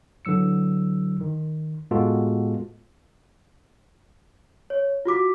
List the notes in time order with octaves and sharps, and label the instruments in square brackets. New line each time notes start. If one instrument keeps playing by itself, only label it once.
[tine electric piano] D3 E3 F#3 E6 C#7
D#3
A2 G#3 B3 F4 F#4 A4
[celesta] C#5
F4 F#4 D6 B6